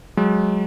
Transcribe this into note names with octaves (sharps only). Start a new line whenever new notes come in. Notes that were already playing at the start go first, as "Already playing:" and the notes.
F#3 G#3